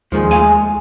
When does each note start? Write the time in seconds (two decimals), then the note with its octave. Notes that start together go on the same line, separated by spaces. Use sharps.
0.12 D#2 A#2 D#3 F3 G#3
0.31 A3 F5 G#5